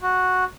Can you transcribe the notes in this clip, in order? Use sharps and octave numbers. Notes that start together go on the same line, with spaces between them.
F#4